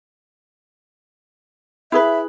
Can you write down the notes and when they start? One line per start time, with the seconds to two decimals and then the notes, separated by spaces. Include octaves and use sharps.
1.92 E4 G#4 B4 E5